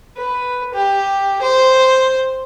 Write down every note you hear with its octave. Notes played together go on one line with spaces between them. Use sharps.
B4
G4
C5